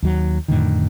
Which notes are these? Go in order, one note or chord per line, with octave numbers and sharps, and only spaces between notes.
D#2 F#3
F2 A2 D3 D#3